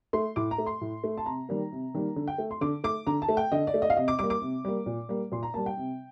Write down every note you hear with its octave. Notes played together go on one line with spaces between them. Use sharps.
A3 C6
A2 D6
A#5
A3
C6
A2
A3
A5
C3 A#5
D#3 G3 A#3
C3
D#3 G3 A#3
D3
G5
A3
C6
D3 D6
A3 D6
D3 A#5
A5
A3
G5
D3 D#5
D5
A3
D#5
F5
C3 D#5
D6
G3 A#3 D6
D6
C3
G3 A#3
A#2
G3 A#3
A#2 C6
A#5
G3 A#3 A5
G5
C3